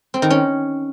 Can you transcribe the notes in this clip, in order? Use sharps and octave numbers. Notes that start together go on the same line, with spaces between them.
C4
D#3
C#4